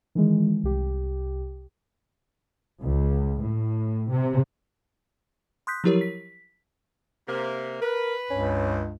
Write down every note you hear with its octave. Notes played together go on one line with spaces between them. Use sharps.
D#3 E3 G#3
C2 G4
C#2
A2
C3
C6 D#6 F#6 G6 B6
F3 F#3 E4 G4 A#4 C#5
B6
C3 A#3
A#4 B4
C#2 G2 C#4